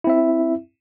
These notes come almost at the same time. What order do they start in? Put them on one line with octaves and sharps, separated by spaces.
E4 C4 E5